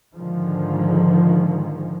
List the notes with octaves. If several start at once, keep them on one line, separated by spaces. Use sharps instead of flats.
G#2 D3 D#3 F3 G#3